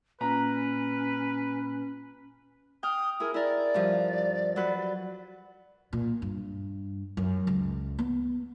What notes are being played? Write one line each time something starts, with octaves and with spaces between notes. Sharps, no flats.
A#2 C#4 B4 A#5
G5 D#6 F6
E4 G#4 A#4
E4 A#4 D5
G2 F3
F#3 B4
A#2
G2
F#2
C#2
B3